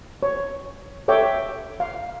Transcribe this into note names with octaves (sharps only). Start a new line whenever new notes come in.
C#5
A4 C#5 E5 G5 D6
F5